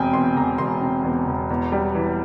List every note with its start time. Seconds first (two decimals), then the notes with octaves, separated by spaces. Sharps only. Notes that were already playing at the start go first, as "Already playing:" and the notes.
Already playing: E1 C3 G5 G#5
0.13 E2 C6
0.37 E1 A#5
0.58 E1 C6
0.81 C3
1.04 E2
1.28 E1
1.50 E2
1.72 G3
1.95 E3